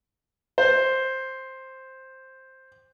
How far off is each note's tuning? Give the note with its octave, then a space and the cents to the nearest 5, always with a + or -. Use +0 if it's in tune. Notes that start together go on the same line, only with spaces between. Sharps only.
C5 +5